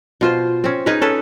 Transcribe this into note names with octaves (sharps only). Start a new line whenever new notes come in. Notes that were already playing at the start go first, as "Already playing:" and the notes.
B2 F4 C5
C4 C#4
D#4 G#4 A#4 B4
C#4 A4 B4